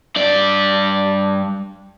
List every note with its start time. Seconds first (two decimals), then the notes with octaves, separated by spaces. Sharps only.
0.16 G2 D5